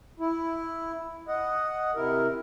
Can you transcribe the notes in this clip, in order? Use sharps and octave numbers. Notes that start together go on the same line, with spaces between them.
E4
D#5 F#5
C3 E4 A#4